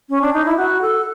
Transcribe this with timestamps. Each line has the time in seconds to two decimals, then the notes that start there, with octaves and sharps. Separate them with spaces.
0.09 C#4
0.22 D4
0.33 D#4
0.45 E4
0.57 F#4
0.81 A4